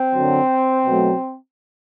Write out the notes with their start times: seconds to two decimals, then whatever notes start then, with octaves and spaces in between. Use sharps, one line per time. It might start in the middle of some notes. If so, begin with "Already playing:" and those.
Already playing: C4
0.13 F#2 D3 F#3
0.86 B2 F#3 A3